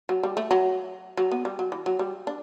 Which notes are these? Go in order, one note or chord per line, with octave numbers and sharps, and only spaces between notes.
F#3
G3
A3
F#3
F#3
B3
G3
F#3
E3
F#3
G3
D4